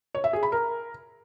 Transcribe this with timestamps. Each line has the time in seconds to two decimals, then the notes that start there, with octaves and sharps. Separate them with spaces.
0.15 C#5
0.24 E5
0.33 G#4
0.43 B5
0.52 A#4